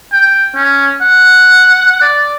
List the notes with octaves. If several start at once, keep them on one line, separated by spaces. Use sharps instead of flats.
G5
C#4
F#5
D5